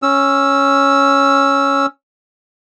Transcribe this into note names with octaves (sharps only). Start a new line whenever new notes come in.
C#4 E6